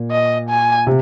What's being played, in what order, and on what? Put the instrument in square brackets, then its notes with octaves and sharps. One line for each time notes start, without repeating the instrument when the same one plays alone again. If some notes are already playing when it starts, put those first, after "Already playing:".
Already playing: [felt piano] A#2
[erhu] D#5
G#5
[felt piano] C3